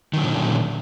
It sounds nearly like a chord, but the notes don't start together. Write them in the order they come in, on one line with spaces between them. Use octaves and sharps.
D#3 F#3 D3 A#2 C#4